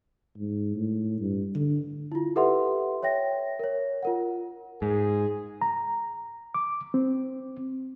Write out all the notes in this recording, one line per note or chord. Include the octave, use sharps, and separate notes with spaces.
G#2
A2
G2
D3
E4 F4
G4 A4 B4 E5 F#5 C6
C#5 E5 G5 A#6
A#4 C#5
F4 A#4 F#5
G#2 G#4
A#5
D6
C4